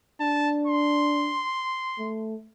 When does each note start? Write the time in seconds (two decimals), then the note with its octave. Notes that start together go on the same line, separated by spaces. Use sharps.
0.21 D4 A5
0.67 C6
1.99 A3